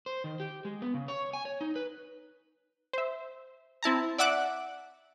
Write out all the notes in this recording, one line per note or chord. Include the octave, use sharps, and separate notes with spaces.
C5
D#3
G4
G#3
B3
C#3
C#5
G#5
C#5
D#4
B4
C5 E5
C4 E4 A5 A#5
D5 E5 F#5 D6 F#6